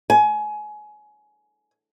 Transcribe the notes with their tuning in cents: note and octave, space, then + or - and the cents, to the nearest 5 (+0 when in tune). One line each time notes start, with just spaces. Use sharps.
G#5 +25